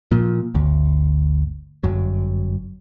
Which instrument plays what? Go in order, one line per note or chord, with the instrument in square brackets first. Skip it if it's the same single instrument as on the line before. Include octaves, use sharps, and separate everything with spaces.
[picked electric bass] A#2 F3
G1 D2
G1 F#2 F#3